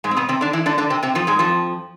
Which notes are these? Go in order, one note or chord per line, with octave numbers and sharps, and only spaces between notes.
G#2 G#3
C4
B2 B3
C3 C4
D3 D4
E3 E4
D3 D4
D3 D4
C3 C4
C3 C4
F2 F3
G#2 G#3
F2 F3